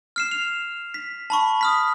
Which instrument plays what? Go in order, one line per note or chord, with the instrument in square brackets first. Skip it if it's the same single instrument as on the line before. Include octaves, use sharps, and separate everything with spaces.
[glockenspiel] F6 C7 E7
F7
B6
A5 B5 C#6
D#6 F6 B6